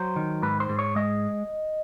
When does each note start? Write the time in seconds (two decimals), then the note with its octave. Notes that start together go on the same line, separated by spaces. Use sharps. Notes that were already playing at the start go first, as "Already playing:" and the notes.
Already playing: F#3 C5
0.16 D#3
0.42 G#2 B4
0.60 C5
0.69 G#2
0.79 C#5
0.96 G#3 D#5